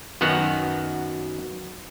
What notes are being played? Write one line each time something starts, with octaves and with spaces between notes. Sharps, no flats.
F#2 D#3 B3 F#4 F#5